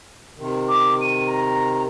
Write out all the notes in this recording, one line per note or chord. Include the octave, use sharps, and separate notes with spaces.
C3 D#3
D6
D#7
A#5